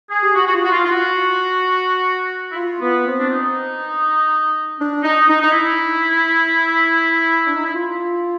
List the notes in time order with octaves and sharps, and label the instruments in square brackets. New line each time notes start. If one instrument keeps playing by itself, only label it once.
[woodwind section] G#4
G4
F#4
F#4
F4
F#4
F4
F4
F#4
E4
F4
B3
C4
D4
D#4
D4
D#4
D#4
D#4
E4
D4
D#4
E4
F4